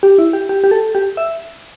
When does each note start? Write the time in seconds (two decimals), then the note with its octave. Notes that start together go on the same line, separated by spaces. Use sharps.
0.03 G4
0.18 E4
0.33 G4
0.49 G4
0.64 G4
0.71 A4
0.95 G4
1.17 E5